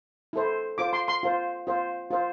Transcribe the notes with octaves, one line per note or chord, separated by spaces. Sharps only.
E4 A4 C5
F4 C5 D6
C6
C6
F4 C5
F4 C5
F4 C5